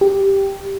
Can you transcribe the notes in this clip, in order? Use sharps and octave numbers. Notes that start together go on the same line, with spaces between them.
G4